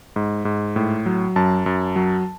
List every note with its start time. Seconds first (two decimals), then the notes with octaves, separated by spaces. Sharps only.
0.16 G#2
0.45 G#2
0.76 A2
1.06 F#3
1.36 F#2 A5
1.66 F#2
1.96 F#3